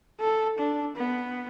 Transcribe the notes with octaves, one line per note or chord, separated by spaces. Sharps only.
A4
D4
B3